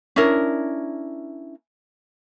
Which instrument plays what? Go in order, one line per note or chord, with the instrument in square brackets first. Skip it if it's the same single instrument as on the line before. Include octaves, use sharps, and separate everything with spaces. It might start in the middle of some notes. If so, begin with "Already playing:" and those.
[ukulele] C#4 D4 E4 A#4